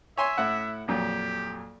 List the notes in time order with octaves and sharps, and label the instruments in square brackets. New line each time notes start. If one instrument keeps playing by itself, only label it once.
[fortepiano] C#5 G#5 C6 [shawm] E5
[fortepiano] A2 E4 F#5
[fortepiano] F2 A#2 F#3 [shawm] G4